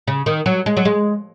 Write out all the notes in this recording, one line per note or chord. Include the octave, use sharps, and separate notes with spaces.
C#3
D#3
F#3
G#3
F#3
G#3